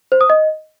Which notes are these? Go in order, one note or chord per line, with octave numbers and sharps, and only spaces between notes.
C5
D#6
D#5